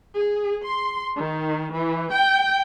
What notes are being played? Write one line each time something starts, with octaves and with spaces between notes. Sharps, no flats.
G#4
C6
D#3
E3
G5